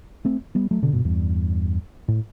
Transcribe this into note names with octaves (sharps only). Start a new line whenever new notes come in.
A3 C4
G3 B3
F#3 A3
B2 D3
G2 B2
E2 G2
A2